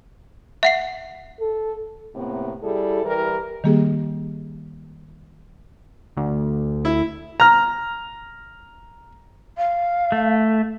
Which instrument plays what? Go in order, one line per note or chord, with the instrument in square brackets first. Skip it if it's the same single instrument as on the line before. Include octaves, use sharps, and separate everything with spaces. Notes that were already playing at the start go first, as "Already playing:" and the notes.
[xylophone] E5 F#5 C7
[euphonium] A4
[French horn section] A2 C3 A#3 B3
G3 E4 G#4 A4
E3 G3 G4 A#4
[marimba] D#3 G3 A#3 G4 G#4
[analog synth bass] D2
[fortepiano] E4
A#5 F6
[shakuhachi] F5
[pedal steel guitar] A3